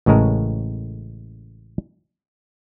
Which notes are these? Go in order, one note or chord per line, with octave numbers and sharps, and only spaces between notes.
A1 A2 C#3 G#3 A#4